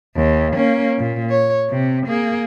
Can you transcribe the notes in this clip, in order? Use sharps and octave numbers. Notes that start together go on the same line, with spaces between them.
D#2
A#3 C#4
A#2
C#5
C3
A#3 G#4